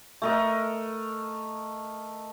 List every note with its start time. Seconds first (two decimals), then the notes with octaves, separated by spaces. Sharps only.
0.22 A3 A#4 D#5